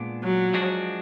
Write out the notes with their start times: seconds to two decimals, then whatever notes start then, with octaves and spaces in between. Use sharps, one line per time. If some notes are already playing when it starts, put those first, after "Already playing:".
Already playing: A#2 G#3 B3 D4
0.24 F#3
0.53 F3 G#3 D4 F#4